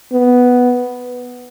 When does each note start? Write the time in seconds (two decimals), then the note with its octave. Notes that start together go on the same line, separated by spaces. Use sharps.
0.13 B3